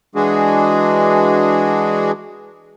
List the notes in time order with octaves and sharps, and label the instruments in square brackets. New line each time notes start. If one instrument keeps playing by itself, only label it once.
[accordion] E3 G#3 D4 F#4 G#4